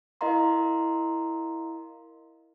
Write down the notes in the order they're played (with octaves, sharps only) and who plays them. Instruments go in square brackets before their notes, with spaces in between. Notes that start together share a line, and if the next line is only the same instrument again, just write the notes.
[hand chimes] E4 A#4 D#5 F5 A#5 C6